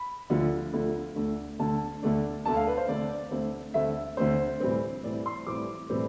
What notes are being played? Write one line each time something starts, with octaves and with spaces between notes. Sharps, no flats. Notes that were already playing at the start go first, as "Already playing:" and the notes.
Already playing: B5
D2 D3 F3
D2 D3 F3
D2 D3 A3 D4
D2 D3 A3 D4 A5
D2 D3 A3 D4
D2 D3 A3 D4 A5
F5
B4
C5
D2 D3 A3 C4 D5
D2 D3 A3 C4
D2 D3 A3 C4 E5
D2 D3 A3 C4 C5
A2 E3 G3 C4
A2 E3 G3 C4 D5
C6
A2 E3 G3 C4 D6
A2 E3 G3 C4